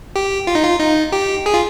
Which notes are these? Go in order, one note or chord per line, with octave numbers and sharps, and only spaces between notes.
G4
F4
D#4
F4
D#4
G4
G#4
F4